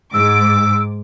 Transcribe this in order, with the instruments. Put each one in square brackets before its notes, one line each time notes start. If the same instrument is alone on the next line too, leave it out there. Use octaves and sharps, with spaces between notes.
[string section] G#2 D6 [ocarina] E6